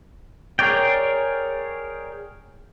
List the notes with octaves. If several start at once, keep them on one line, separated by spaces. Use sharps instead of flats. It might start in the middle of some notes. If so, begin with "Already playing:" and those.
G#4 A#4 C#5 D5 G5